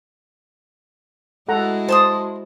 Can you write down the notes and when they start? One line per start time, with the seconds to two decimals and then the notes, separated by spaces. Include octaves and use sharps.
1.48 G#3 E4 F#4 A4 F#5 A#5
1.89 C5 A5 C6 D#6